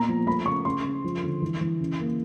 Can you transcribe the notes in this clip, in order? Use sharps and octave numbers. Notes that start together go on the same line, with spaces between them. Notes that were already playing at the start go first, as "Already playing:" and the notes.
Already playing: A#2 B3 A#5
F3
A3 B5
C#3 C#6
C#3 C6
C#3
F3
D3
E3
E3
C#3
A#3